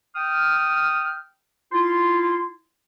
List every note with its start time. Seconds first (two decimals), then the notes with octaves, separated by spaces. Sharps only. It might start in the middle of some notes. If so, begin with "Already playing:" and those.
0.16 G5 D#6 F6
1.72 E4 F4 C6